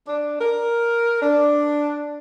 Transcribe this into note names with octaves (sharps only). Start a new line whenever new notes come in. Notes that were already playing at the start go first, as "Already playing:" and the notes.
D4
A#4
D4